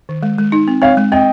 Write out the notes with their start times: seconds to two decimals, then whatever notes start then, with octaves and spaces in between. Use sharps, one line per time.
0.09 D#3
0.23 G#3
0.38 G#3
0.52 D#4
0.68 C4
0.82 C4 C#5 F5
0.97 G#3
1.12 C4 D#5 G5